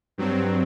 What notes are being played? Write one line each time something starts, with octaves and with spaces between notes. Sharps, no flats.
G2 F#3 C4